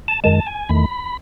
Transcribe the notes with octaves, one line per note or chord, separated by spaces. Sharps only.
A5
F#2 D#3 G#3 A5
G#5
E2 D#3 A3 B5